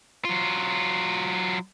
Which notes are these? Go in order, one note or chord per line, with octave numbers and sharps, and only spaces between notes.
F#3 F4